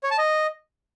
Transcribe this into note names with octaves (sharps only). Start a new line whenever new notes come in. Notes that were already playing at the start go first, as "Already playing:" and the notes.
C#5
A5
D#5